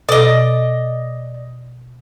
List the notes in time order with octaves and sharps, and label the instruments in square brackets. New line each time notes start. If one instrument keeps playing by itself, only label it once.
[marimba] B2 A4 [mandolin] D5 D#5